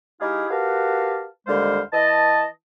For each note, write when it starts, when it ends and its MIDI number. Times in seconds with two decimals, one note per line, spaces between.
0.21 0.46 56
0.21 0.46 63
0.21 0.46 64
0.21 0.46 67
0.21 0.46 68
0.21 0.46 77
0.50 1.26 66
0.50 1.26 67
0.50 1.26 70
0.50 1.26 71
0.50 1.26 77
0.50 1.26 81
1.47 1.80 39
1.47 1.80 50
1.47 1.80 55
1.47 1.80 56
1.47 1.80 72
1.47 1.80 77
1.93 2.45 52
1.93 2.45 75
1.93 2.45 81